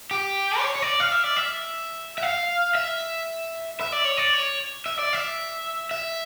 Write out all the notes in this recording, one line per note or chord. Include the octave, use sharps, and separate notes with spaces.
G4
D5
C#5
C#5
D5
F5
E5
D5
E5
E5
F5
E5
E5
D5
C#5
D5
C#5
E5
D5
E5
E5